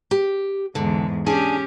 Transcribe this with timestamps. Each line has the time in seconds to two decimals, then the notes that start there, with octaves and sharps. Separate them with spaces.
0.11 G4
0.75 E2 G#2 D3
1.26 C#4 D4 G4 G#4 G#5